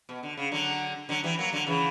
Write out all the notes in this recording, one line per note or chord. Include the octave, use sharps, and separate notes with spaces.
B2
D3
C#3
D3 F#3
D3 F#3
E3 G3
F#3 A#3
D3 F#3
C#3 E3